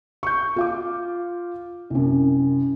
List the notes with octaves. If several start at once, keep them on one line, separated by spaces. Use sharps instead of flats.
C#6 G6
F4 F5 D6
C2 F#2